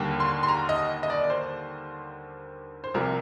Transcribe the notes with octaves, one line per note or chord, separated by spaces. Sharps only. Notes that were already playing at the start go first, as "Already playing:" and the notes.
Already playing: D#2 D3 G3 A#3
C6
C6
A#5
D#5
D#5
D5
D5
C5
C5
C2 C3 F3 A#4